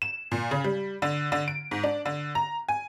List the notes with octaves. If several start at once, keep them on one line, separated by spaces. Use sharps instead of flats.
E7
A#2
C#3
G3
D3
D3
D7
G#2
D4
D3
A#5
G#5